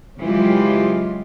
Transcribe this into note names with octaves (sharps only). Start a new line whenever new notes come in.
C#3 E3 F#3 G#3 F4 G4